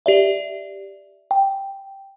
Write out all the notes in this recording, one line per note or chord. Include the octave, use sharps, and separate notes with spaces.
G4 D5 E5
G5